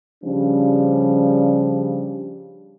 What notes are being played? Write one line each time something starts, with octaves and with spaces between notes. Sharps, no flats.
C#3 F3 G3 C#4 D4